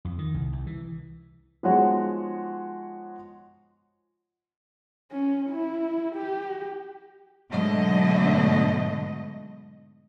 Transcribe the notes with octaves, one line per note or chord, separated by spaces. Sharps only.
F2
D#3
C2
C2
E3
F3 G#3 B3 D#4 F#4 C#5
C#4
E4
G4
G#2 B2 D3 F#3 A3 D#5